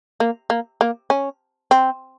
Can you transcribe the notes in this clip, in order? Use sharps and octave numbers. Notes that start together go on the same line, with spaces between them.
A#3
A#3
A#3
C#4
C4